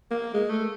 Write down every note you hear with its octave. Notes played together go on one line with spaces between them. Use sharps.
A#3
G#3
A3